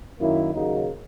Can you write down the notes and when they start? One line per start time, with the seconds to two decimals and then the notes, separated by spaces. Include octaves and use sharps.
0.19 F#2 D#3 A#3 E4
0.54 D#2 C#3 F#3 A#3 D#4